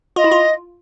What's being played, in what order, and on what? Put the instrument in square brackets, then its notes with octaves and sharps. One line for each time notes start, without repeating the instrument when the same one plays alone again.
[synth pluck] F4 [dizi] D#5
[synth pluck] E4
F4